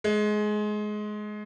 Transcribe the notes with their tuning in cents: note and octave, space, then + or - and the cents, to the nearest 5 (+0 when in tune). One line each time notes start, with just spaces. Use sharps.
G#3 +20